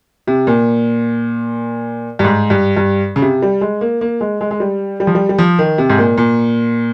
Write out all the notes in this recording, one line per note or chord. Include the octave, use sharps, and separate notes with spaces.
C3
A#2
G2
G#2
G2
G2
C#3
C3
G3
G#3
A#3
A#3
G#3
G#3
G#3
G3
G3
F3
G3
G3
F3
D#3
C3
G#2
A#2
A#2